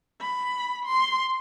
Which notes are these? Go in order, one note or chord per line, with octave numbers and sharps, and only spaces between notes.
B5
C6